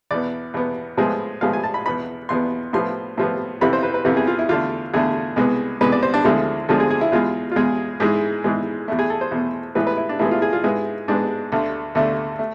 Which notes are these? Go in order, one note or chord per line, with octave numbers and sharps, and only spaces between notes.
E2 B2 B3 D5
E2 B2 B3
A2 F3 G#3 B3
A2 F3 G#3 B3 F5
G#5
A5
B5
E2 B2 B3 B5
E2 B2 B3 C6
A2 F3 B3 C6
A2 F3 B3
F2 C3 E3 B3 B5
C5
B4
B4
F2 C3 E3 B3
G#4
F4
E4
E2 D3 A3 F4
E2 D3 A3 G#4
C2 B2 G#3 B3
C2 B2 G#3 B3 B4
D5
C5
D4
D2 D3 F3 G#3 E4
D2 D3 F3 G#3 F4
G#4
G#4
E4
E2 B2 G#3 F4
F4
E2 B2 G#3 G#4
G#2 E3 G#3
G#2 E3 G#3
E2 B2 A3
G#4
A4
C5
E2 B2 A3
A2 E3 G#3 B3 B4
B4
E4
D4
A2 E3 G#3 B3 E4
F4
G#4
F4
G#2 G#3 B3 E4
G#2 G#3 B3 D4
D2 D3 A3
D2 D3 A3
A3